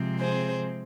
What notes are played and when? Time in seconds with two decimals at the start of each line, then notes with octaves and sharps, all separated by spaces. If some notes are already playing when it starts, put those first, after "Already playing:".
Already playing: C3 F3 G#3 C4
0.19 G#4 C5